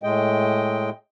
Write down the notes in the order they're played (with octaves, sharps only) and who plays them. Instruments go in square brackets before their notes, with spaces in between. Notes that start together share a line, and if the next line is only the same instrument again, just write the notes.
[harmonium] A2 G#3 D#5 G5